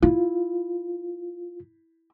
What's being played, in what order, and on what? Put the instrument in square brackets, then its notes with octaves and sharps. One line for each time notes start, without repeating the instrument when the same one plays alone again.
[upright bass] E4 [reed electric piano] F4